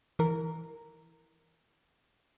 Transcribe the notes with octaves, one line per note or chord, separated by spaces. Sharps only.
E3 A#4